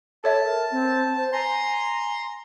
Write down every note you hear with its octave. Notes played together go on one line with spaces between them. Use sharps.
A4 C#5 E5 A5
A#4
C4
C5
G#5 A#5 C6